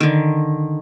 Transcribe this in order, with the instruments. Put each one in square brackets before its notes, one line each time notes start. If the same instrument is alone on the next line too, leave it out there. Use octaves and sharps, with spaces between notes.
[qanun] D3 D#3